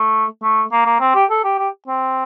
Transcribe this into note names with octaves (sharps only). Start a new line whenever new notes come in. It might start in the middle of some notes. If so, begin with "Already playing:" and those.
Already playing: A3
A3
A#3
A#3
C4
G4
A4
G4
G4
C4